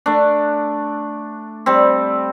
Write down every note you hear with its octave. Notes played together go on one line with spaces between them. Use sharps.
A3 D4
G3 C4